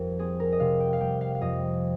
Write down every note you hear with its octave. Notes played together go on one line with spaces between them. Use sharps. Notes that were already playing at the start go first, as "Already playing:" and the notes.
Already playing: F2 G3 A#4
C4 G#4
A#4
D#5
C3 F5
G5
F5
G3 G5
F5
F5
F2 D#5